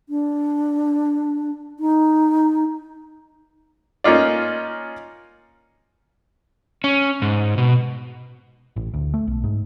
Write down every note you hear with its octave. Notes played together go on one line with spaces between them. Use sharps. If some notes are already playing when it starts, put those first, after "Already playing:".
D4
D#4
A#3 C#4 D#4 F4 D5
C#4
G#2
B2
A1
D2
A3
B1
G#2